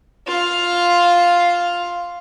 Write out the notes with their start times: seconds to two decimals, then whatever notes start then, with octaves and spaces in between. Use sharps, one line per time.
0.28 F4 F5